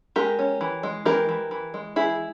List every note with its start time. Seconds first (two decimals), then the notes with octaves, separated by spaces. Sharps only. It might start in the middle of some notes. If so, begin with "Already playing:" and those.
0.16 G#3 G4 A#4
0.39 C#4
0.61 E3
0.83 G#3
1.05 E3 G4 A#4
1.29 E3
1.51 E3
1.74 G#3
1.96 E3 E4 G#4